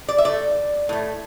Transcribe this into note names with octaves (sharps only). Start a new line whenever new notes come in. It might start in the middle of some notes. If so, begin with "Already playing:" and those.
D5
E5
A2 A3 D5
A2 A3